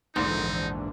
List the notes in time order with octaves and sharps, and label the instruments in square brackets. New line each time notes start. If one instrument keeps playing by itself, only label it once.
[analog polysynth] A#1 E2 D3 [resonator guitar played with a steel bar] G#2 [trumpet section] C4 D#4